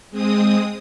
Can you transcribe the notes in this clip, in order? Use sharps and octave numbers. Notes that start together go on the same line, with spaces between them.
G#3 C4 D#6